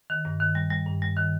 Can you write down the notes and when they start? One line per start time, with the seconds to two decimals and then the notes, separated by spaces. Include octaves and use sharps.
0.10 D#3
0.25 G2
0.40 D#3
0.55 G3
0.70 G3
0.86 G2
1.02 G3
1.16 D#3